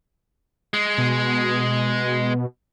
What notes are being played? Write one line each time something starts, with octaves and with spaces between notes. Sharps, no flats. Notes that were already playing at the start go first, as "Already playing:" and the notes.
G#3
B2